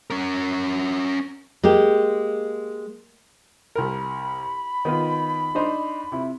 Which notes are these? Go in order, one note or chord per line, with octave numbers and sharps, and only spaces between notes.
C#4 A#4
G#3 A#3 G4
C2 A#4 B5
D#3 B3 F4
D4 D#4 C5
C3 E4